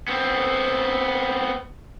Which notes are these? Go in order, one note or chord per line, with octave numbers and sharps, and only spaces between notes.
B3 C4